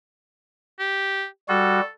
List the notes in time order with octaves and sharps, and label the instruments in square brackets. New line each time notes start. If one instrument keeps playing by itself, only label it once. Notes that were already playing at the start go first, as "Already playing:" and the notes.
[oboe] G4
[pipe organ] G3 F#4 [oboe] A4